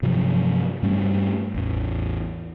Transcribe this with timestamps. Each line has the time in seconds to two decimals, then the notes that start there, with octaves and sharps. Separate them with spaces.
0.02 G2 C3 F3 F#3
0.83 G2 G3 A3 C#4
1.54 A1 E2